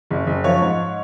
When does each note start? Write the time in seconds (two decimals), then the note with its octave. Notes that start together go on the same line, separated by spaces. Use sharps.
0.11 F#1
0.27 F#1
0.44 F3 C#5
0.62 G#2